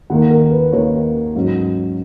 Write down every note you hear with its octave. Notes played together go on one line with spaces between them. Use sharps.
D#2 D#3 A#3 F#5
A#4
B4
D#2 D#3 A#3 C#5
G#2 F#3 C#4